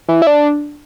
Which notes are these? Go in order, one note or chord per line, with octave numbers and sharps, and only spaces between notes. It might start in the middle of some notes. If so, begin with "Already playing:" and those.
E3
E4
D4